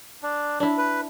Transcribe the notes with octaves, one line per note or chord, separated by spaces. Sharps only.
D4
D4 E4
B4